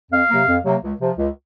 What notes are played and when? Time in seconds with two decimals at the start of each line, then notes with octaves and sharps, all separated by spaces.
0.12 F2 F5
0.30 C3 F#3 A#3
0.48 F2
0.65 C3 F#3 A#3
0.83 C#2
1.00 C3 F3
1.18 C#2